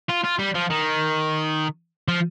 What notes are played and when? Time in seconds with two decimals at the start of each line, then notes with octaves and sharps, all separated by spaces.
0.09 F4
0.24 F4
0.39 G3
0.55 F3
0.70 D#3
2.08 F3